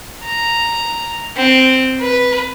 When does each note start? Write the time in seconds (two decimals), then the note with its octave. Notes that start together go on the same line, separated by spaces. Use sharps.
0.24 A#5
1.36 C4
2.00 B4